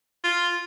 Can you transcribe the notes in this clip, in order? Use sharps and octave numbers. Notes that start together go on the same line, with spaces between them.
F4